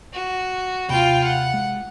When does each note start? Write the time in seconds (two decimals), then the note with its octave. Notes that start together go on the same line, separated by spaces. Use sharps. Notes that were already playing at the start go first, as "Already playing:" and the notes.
0.13 F#4
0.89 D#2 C3 F4 G5 B5
1.24 F#5
1.54 G#3